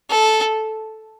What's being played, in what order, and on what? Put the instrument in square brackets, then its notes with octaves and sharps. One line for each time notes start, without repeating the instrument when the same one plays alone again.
[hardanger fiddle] A4